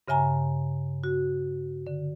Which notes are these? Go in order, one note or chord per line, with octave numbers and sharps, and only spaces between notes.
G2 C#3 E5 G#5 A#5
F#4
D3